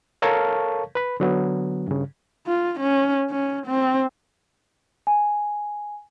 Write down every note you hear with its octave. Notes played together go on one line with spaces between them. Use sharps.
A4 A#4 C#5 F5 A5 C#6
B4 B5
D3 F#3 B3
G2 C#3
F4
C#4
C#4
C4
G#5